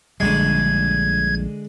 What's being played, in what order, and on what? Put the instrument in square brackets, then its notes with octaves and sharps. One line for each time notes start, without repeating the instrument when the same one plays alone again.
[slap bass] A#1 G3 [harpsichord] D3 G#3 [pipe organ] G#6